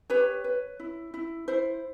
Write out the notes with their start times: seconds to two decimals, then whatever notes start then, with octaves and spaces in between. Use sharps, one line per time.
0.10 G4 B4 C#5
0.44 B4
0.80 E4
1.14 E4
1.48 E4 C5